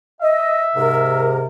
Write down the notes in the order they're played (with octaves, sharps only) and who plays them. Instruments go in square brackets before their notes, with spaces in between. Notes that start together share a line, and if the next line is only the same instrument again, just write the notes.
[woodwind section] D#5 [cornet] E5
[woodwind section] G#2 C3 A#4